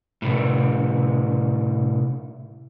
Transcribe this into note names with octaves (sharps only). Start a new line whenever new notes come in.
A2 C3